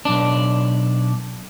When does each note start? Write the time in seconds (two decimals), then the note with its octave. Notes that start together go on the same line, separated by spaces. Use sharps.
0.05 B1 D4